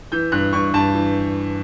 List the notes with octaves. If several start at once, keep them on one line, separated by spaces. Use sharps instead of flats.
E3 G6
G2 F#6
G2 C#6
G2 A5
E3